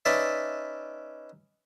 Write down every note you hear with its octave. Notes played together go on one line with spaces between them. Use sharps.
C#4 D#4 B4 D5 E5 A5